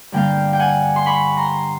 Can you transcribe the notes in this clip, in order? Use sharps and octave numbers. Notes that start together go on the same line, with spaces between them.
G2 D3 G3 A#3 F5 G5
G5
F#5 G#5
C6
B5 C#6
A#5 C6